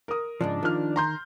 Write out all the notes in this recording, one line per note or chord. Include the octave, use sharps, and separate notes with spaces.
A#4 D#6
G#2 C#3 F3 D4
D#3 F3 F6
A#5 C6 G6